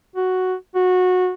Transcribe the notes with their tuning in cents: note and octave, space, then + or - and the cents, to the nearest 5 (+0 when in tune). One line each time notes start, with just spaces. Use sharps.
F#4 +0
F#4 -20